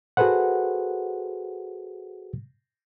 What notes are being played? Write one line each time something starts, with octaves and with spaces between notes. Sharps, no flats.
F#4 G#4 A4 B4 C5 F#5